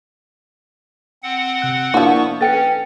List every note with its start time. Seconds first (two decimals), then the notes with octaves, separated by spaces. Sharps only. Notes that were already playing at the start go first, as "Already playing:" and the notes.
1.23 C4 F#5
1.62 C3 F#6
1.94 F3 A#3 B3 D4 E4 F#4 C#6
2.41 C#4 A4 B4 G5 A6 C#7